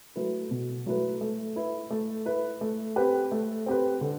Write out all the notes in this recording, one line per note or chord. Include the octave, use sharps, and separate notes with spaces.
F#3 A3 E4 B4
B2
F#3 A3 E4 B4
A3
E4 B4
A3
E4 B4
A3
C4 G4 B4
A3
C4 G4 B4
D3